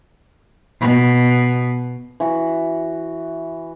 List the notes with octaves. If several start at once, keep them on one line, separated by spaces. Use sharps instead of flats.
B2
E3 F#4